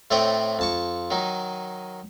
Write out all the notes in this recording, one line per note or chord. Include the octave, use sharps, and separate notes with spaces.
A2 A3 C4 C#5 D#5 G5
F2 A5 C#6
D#3 F#3 D#4